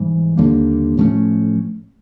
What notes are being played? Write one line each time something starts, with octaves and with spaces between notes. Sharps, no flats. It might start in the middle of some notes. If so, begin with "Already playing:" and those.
Already playing: G#2 E3 G3
D#2 D3 G3 A#3
A2 F3 A3 C#4